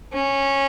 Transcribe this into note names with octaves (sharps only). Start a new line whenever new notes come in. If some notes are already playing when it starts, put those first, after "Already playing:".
C#4